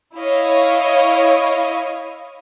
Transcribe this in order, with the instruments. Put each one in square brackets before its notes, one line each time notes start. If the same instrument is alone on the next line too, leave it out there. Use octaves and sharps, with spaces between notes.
[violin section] E4 C#5 D#5 F5